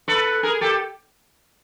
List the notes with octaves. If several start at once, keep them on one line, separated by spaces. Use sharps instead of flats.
A4 B4
G#4 A#4
G4 A4